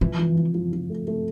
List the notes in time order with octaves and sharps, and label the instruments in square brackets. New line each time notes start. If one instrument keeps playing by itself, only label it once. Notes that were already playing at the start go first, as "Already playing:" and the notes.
[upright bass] E3 [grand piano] F3
[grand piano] F3
F3
F3
F3
A3
A3